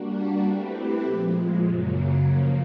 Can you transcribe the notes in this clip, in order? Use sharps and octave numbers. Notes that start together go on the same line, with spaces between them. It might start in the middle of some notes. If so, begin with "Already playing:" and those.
Already playing: G3 A#3 D4 F#4
A3 C4 E4 G4 B4
A#2 F3 G#3
F#2 C#3 F#3 A#3
C#3 F3 A#3